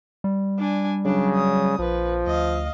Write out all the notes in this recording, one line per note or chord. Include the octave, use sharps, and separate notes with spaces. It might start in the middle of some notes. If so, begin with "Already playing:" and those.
G3
D4 G#5
C#3 F#3 D4
D#6
A#1 F3 B4
D2 D#5 F5